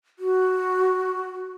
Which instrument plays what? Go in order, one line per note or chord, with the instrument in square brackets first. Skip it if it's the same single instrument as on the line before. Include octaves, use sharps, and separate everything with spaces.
[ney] F#4